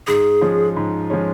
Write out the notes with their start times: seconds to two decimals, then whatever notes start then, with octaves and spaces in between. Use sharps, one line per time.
0.07 G#2 G#4
0.41 F3 G#3 C#4
0.77 G#2
1.10 F3 G#3 C#4